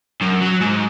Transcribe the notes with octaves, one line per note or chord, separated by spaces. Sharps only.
F#2
F#3
G#2